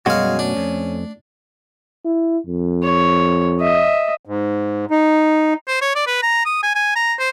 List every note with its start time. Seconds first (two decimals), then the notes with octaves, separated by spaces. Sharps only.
0.06 F#2 B2 G3 G#3 C#4 F#4 F5
0.39 A3 D4
0.57 F2
2.05 E4
2.47 F2
2.83 C#5
3.61 D#5 E5
4.25 G#2
4.91 D#4
5.67 C5
5.81 C#5
5.95 D5
6.07 B4
6.23 A#5
6.45 D#6
6.63 G#5
6.75 G#5
6.95 A#5
7.19 C5